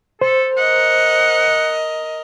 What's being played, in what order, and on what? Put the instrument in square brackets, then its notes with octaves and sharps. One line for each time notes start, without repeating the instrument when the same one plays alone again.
[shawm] A4 [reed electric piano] C5
[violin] A#4 D#5 [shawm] F#5